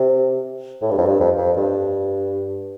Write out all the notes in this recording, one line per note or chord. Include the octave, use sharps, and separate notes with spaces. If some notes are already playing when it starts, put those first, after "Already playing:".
Already playing: C3
A2
G2
F2
G2
F2
F2
G2